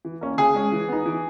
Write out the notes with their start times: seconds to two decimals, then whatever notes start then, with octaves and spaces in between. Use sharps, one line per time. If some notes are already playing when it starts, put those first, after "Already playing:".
0.05 E3
0.21 A#3 C#4
0.37 C#3 G#4 G#5
0.54 G#3 C#4
0.72 E3
0.88 B3 D#4
1.06 E3